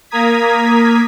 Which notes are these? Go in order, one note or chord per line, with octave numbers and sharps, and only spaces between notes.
A#3 A#5 D#6 G#6 B6